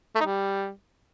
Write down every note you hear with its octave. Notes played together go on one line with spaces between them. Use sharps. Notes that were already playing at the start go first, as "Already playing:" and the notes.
A3
D#4
G3